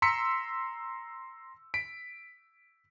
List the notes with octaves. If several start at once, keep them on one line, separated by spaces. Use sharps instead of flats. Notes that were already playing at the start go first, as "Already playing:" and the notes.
A#5 C6 E6 B6 C#7
B6 D7